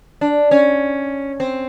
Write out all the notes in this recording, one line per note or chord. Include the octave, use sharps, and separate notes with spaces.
D4
C#4
C4